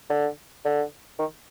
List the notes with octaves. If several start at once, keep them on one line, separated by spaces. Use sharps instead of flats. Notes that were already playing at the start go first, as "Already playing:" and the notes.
D3
D3
D#3